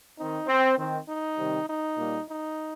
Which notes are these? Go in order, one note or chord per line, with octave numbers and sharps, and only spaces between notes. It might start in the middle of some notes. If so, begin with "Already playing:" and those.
D#3 C4 D#4
C4
D#3 C4
D#4
C3 D#3 G3 C4
D#4
A#2 G3 A#3
D#4